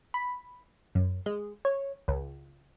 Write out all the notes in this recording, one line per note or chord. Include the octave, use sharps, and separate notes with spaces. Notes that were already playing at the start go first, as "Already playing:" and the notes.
B5
F#2
G#3
C#5
C#2